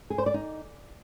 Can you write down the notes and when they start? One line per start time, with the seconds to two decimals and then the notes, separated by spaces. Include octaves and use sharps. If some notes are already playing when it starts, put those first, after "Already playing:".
0.10 G#4
0.18 C5
0.26 D5
0.34 D#4